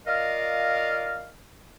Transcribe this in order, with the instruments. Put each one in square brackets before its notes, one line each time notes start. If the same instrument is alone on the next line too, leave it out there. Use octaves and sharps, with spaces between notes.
[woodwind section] F4 A#4 D5 D#5 F5